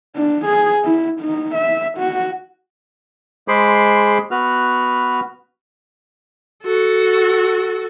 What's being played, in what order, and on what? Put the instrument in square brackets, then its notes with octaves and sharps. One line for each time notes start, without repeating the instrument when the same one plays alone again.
[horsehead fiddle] D4
G#4
E4
D#4
E5
F#4
[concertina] G#3 G#4 C5 B5 C6 D6
B3 F#4 B4 F6
[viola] F#4 A4